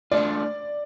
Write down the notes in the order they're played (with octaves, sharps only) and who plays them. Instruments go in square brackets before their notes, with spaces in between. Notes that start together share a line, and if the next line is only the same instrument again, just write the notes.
[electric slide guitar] A3 D4 F4 [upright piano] D5